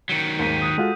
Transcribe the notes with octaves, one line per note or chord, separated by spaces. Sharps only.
D#3 F#3 B6
D#2 G#2 G6 B6 D#7
D#6 F#6 G6
G#3 F4 F#4 A4 F#5